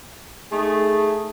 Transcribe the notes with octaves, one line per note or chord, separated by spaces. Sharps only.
A3 D#4 G#4